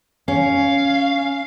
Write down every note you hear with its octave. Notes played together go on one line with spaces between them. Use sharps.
C#4 F5